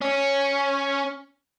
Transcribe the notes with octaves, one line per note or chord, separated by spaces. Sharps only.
C#4